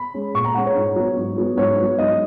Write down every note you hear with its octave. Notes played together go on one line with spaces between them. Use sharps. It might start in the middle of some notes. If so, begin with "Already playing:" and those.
Already playing: B5
G#3 C#4
A#2 C#6
A#5
G#3 C#4 F#5
C#5
G#2
F#3 B3
G#2
F#3 B3
G#2 C#5
F#3 B3
G#2 D#5